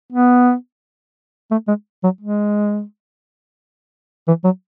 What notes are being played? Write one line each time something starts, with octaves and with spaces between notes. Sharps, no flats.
B3
A3
G#3
F#3
G#3
E3
F#3